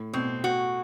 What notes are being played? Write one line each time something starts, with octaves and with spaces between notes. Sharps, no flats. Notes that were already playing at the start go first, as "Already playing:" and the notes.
Already playing: A2
B2 C4
F#4